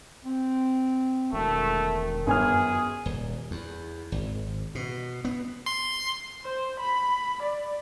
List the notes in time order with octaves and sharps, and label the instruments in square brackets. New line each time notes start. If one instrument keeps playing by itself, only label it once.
[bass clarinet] C4
[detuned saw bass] E1 [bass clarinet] D#3 [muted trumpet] A3
[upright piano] G1 G#5 F6 [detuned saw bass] F#2 [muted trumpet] G#4
[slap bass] D#1
E2
G#1
B2
B3
[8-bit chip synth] C6
[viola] C5
B5
D5